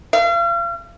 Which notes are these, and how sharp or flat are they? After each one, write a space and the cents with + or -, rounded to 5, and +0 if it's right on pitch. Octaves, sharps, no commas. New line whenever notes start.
F5 -40